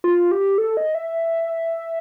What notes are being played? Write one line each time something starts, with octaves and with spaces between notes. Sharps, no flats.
F4
G4
A4
D#5
E5